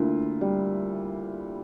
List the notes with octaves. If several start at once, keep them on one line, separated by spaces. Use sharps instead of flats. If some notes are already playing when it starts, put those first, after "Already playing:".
Already playing: D2 A#3 E4 F4
G3